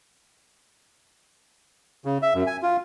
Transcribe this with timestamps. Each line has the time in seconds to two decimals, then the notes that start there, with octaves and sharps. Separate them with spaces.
2.05 C#3
2.22 E5
2.34 F#2
2.47 G#5
2.63 F4